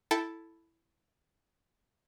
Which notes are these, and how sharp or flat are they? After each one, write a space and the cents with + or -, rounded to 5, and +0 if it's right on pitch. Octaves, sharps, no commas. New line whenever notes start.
E4 +5 A4 +0 G5 +0